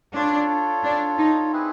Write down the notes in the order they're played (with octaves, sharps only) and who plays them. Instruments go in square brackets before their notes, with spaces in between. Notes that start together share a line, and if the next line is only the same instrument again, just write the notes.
[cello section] D4 [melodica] F4 A4 C#5
[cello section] D4
D#4
[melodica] C4 E4 G#4 B4